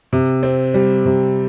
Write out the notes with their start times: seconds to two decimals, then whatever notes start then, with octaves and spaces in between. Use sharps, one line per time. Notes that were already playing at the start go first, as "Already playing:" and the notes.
0.13 C3
0.43 C4
0.74 G3
1.05 C3